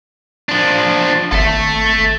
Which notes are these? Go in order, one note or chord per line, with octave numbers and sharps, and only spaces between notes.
F3 D4
G#1 A4 E5